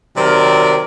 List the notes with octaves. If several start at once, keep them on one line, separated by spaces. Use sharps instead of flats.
C3 D#3 F#3 C4 A#4 D5